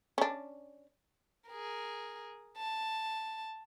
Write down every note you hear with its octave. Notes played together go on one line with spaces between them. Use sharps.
C#4 D4
G#4 A#4
A5